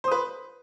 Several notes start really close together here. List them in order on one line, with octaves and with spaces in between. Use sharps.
C5 D#6 B4